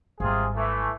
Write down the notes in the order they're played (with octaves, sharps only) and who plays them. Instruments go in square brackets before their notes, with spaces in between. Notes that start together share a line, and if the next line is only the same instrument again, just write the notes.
[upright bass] G#1 G3 [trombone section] C3 F4 G#4
[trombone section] E3 A3